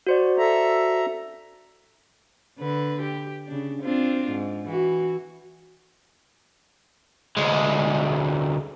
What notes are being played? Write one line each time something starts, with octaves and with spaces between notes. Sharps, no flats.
F#4 C5 D5
A4 E5 A#5
D3 B4
G4
C#3 D4
C4 D4 F4
G#2
E3 F#4
D2 G#3